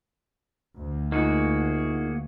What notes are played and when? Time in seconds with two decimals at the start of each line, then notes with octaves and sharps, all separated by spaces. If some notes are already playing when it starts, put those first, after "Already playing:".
0.77 D2
1.12 A#3 D#4 F4 F#4 G#4